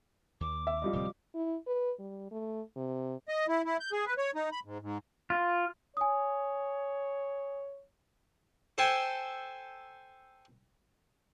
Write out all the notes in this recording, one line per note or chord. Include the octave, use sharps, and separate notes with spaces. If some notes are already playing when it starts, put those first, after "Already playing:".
D#2 D6
E5
F3 G3 D#5
D1 C3 C4
E4
B4
G3
A3
C3
D#5
E4
E4
G6
G#4
B4
C#5
D#4
B5
G#2
G#2
F4
C#5 G#5 D#6
A4 C5 G5 G#5